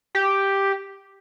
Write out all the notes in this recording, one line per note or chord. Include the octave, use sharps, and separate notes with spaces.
G4